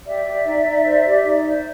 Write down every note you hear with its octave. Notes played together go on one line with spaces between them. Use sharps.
G4 D5 E5
G4
D#4
D#4
C5
G4
D#4
C5